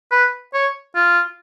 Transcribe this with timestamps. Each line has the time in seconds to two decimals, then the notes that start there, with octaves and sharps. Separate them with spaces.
0.11 B4
0.54 C#5
0.95 F4